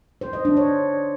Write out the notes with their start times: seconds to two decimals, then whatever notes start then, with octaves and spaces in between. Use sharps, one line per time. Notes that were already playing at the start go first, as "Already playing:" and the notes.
0.21 C5
0.33 D#5
0.45 D4
0.57 C#5